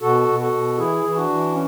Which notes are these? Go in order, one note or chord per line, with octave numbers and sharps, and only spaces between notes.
B2 F#4 A4
B2
F#4 A4
B2
E3 E4 G#4
E3
E4
D4 F#4
E3
C#4